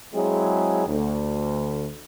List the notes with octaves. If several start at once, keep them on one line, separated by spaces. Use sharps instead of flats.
F#3 G#3 C4 E4 G#4
D2